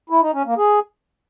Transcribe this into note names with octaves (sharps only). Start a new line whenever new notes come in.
E4
D#4
C#4
A#3
G#4